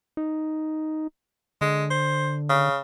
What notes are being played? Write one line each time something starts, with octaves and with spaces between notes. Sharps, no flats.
D#4
D3 G#3
C5
C#3